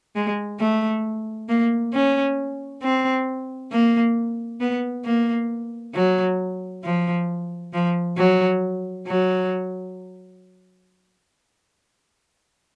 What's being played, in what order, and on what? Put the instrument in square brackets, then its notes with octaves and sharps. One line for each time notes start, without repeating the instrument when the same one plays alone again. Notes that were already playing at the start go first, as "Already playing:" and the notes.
[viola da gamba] G#3
A3
A#3
C#4
C4
A#3
B3
A#3
F#3
F3
F3
F#3
F#3